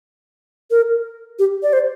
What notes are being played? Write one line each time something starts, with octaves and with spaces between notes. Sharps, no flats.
A#4
G4
D5
C5